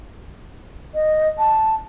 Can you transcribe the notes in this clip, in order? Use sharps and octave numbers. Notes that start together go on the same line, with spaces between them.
D#5
A5